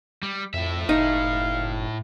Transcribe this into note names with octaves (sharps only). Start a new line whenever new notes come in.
G3
F2 A2 E5
F#1 D#4 F5